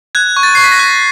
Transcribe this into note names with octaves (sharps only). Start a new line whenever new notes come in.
F#6 G#6
C#6
A6
C#6 C7
B6
A#6
F#6